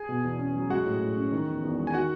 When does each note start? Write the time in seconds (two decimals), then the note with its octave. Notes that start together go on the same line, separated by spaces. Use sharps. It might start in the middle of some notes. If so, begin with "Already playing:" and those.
Already playing: G#4 G#5
0.09 B2
0.24 E2
0.39 C#4
0.55 F#3
0.70 G#3 F#4 F#5
0.86 A2
1.01 A2
1.17 C#4
1.32 D#3
1.47 E2
1.63 E2
1.79 G#3
1.87 G#5
1.94 D#3 F#4 F#5